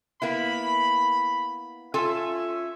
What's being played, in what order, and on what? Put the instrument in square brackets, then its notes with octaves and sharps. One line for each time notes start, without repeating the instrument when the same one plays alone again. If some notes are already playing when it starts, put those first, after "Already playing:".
[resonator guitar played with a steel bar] A#3 B3 E4 [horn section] B5
[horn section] C#4 E5 [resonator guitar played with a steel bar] F4 A4 G#5